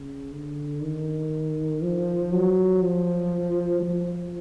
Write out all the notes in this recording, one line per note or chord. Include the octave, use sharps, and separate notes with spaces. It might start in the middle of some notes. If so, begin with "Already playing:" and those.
Already playing: C#3
D3
D#3
F3
F#3
F3
F3